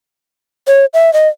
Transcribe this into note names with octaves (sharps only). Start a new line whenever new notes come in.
C#5
E5
D#5